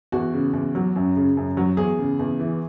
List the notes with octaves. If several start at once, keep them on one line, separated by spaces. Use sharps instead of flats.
E2 F#4
C#3
E2
F#3
F#2
C#3
F#2
F#3
E2 G#4
C#3
E2
E3